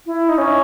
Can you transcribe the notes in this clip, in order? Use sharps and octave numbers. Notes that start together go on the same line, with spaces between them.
E4
D#4
C#4